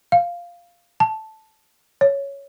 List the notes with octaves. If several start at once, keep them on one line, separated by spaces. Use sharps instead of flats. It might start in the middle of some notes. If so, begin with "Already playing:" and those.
F5
A5
C#5